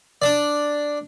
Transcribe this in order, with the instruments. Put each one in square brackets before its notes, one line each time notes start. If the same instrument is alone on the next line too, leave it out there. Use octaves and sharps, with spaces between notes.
[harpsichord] D4 D5